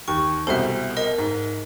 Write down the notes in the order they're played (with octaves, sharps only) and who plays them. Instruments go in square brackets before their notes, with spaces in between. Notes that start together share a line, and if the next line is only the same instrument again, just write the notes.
[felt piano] D#2 [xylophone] C#6
[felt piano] C2 B2 C5 [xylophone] A4 E5
[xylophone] A#4 D#5
[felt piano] G#2